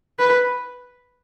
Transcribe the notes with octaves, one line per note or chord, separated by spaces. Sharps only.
B4